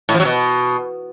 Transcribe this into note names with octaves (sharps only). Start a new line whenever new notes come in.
A2
F3
F#3
B2